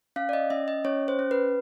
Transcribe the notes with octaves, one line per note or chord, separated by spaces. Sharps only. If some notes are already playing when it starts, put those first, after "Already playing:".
C#4 F5
D5
D#5
C#4 E5
D#5
C#4 C#5
C5
C#4
B4